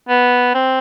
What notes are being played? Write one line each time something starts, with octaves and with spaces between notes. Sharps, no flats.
B3
C4